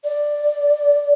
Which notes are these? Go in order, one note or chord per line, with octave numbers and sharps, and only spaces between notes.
D5